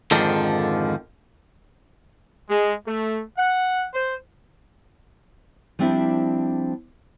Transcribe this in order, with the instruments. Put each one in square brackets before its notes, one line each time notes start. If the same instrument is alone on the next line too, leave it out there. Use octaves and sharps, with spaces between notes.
[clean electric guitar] F2 G#2 D3 D#3 F3
[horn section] G#3
A3
F#5
C5
[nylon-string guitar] F3 G3 C4 D4 E4 E5